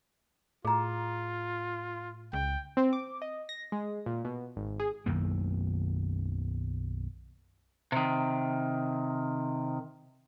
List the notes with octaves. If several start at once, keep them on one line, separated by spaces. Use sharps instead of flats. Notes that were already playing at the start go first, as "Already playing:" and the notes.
A2 F4 G#4 A#5
C#2 G5
C4
D6
D#5
A#6
G#3
A#2
B2
G#1
G#4
B1 F#2 D#3 A#3
C3 D#3